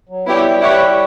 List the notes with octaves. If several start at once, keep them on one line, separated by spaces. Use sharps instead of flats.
F#3
G3 B3 E4 G4 C#5
E4 G4 C#5 F#5